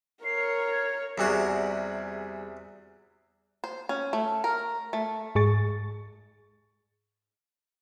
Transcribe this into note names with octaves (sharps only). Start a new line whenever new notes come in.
A#4 C#5 C7
G#6
E2 C3 G3 F#4 G#4
C5
C#4
A3
A#4
A3
G#2 G#4 C#6 A6